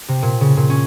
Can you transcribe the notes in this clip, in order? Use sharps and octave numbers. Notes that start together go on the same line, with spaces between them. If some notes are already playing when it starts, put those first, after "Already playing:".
C3
A#2
C#3
A#2
C#4